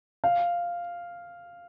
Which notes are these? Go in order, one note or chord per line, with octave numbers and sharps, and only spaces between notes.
F5